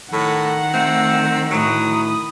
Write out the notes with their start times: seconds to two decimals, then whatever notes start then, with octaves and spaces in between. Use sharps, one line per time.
0.13 A2 D#3 F#5
0.73 A3 C4
1.51 D2 A2 F#3 B5 D#6